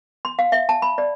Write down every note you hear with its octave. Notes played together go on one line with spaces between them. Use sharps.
C6
F5
E5
A5
B5
D5